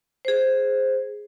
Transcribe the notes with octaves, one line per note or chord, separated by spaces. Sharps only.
G#4 C5